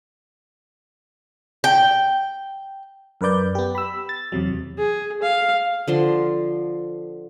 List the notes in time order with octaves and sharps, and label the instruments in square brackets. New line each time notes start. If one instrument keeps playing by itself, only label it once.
[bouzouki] G5
[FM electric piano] F#2 A#4 B4 D5 G6
B3 G4
B5 E6
A6
E2 C3 F#3
[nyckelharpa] G#4
F5
[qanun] D3 F3 C6